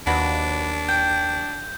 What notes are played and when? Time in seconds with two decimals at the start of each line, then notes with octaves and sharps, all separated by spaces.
0.07 D#2 D4 F#4 B4 D5
0.89 G5 G6